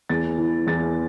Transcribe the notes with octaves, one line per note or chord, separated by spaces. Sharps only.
E2 A6
E3
E2 A6